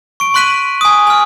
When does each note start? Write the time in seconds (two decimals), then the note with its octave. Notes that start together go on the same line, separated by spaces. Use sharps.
0.20 C#6 D7
0.34 C6 C#6 F#6 B6 D#7 F#7
0.81 G#5 D#6
1.07 G#5 F6